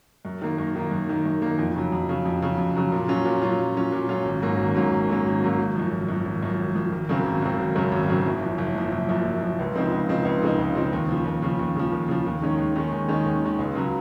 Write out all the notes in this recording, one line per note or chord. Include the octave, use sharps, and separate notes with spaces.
F#2
D#3 A#3
F#2
D#3 A#3
F#2
D#3 A#3
F#2
D#3 A#3
F2
C#3 F#3
F2
C#3 F#3
F2
C#3 F#3
F2
C#3 F#3
A#2
F#3 C#4 F4
A#2
F#3 C#4 F4
A#2
F#3 C#4 F4
A#2
F#3 C#4 F4
G#1
G#2 F#3 A#3 C#4
G#1
G#2 F#3 A#3 C#4
G#1
G#2 F#3 A#3 C#4
G#1
G#2 F#3 A#3 C#4
G#1
F#2 F3
G#1
F#2 F3
G#1
F#2 F3
G#1
F#2 F3
G#1
F#2 C#3 F#3 C4
G#1
F#2 C#3 F#3 C4
G#1
F#2 C#3 F#3 C4
G#1
F#2 C#3 F#3 C4
F#1
F#2 F3
F#1
F#2 F3
F#1
F#2 F3
F#1
F#2 F3
C#2
C#3 F3 C4 D#4
C#2
C#3 F3 C4 D#4
C#2
C#3 F3 C4 D#4
C#2
C#3 F3 C4 D#4
D#2
C#3 F3
D#2
C#3 F3
D#2
C#3 F3
D#2
C#3 F3
D#2
D#3 G#3 C#4
D#2
D#3 G#3 C#4
D#2
D#3 G#3 C#4
D#2
D#3 G#3 C#4
C#2
C#3 F#3